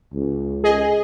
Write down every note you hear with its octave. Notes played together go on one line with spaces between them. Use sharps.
C#2
G#4 D#5